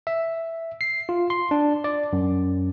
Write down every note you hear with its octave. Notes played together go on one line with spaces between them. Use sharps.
E5
C7
F4
C6
D4
D5
F#2